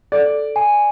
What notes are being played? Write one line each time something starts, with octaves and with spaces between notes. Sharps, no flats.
A4 D5
G#5